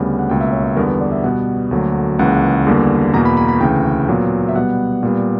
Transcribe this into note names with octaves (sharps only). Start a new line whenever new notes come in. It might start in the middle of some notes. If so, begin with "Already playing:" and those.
Already playing: D2 C#3 G3 B3
F#5
C#2 B2 A#3 G5
E5
C#5
C#5
E2 D3 G3 B3 A#4
B4
D5
E5
B2 G3 B3 F#5
D2 D3 F#3 A#3
C#2 C#3 E3 A#3 F#5
E2 D3 G3 A#3
E2 B2 A#3 A#5
B5
B5
B5
D2 C#3 E3 G5
A#2 F#3 B3
E5
B2 G3 B3 F#5
A#2 G3 B3